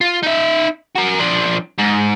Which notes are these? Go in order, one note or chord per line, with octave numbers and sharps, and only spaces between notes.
F4
D#4 E5
F#4 A#4
F3 D4
G#2